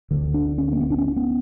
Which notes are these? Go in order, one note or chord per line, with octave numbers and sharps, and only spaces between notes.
D2 D3
D4
C#4
A#3
B3
D4
C#4
B3